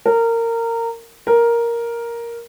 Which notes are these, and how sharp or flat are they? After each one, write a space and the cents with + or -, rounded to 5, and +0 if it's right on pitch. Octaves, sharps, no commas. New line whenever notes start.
A#4 -20
A#4 +5